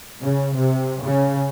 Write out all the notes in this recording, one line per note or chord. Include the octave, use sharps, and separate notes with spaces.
C#3
C3
C#3